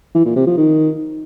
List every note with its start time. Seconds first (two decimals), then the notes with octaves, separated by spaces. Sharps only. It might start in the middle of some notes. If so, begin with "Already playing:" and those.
0.15 E3
0.25 A#2
0.36 C3
0.47 F3
0.57 D#3